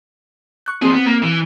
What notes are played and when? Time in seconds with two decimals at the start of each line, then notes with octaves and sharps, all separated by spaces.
0.66 C#6 F#6
0.82 F3 C4 G#4
0.94 B3
1.06 A#3
1.22 E3